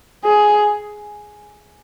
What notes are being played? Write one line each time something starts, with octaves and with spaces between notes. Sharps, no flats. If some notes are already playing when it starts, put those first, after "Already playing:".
G#4